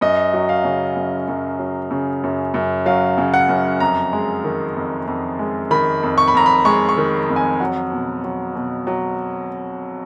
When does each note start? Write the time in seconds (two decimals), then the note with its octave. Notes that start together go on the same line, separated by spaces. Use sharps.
0.01 F#2 D#5
0.33 F#3
0.49 F5
0.64 C#3
0.96 F#2
1.28 F#2
1.59 F#3
1.91 C#3
2.23 F#2
2.54 F#2
2.86 F#3 F5
3.18 C#3
3.34 F#5
3.49 F#2
3.80 F2 A#5
4.13 G#3
4.44 D#3
4.76 F2
5.07 F2
5.39 G#3
5.71 D#3 B5
6.03 F2
6.18 C#6
6.28 B5
6.34 F2 A#5
6.46 B5
6.65 G#3 C#6
6.89 C#6
6.97 D#3
7.29 F2
7.36 G#5
7.60 F#3 F#5
7.92 B2
8.24 F#3
8.55 B2
8.87 F#3